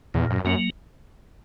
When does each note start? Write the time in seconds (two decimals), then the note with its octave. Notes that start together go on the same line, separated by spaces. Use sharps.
0.14 E2 A#2
0.30 F#2
0.45 F#2 F#3 A#3